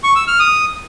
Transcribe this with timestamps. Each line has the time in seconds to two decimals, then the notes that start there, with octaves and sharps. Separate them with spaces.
0.04 C#6
0.16 E6
0.28 F6
0.39 D#6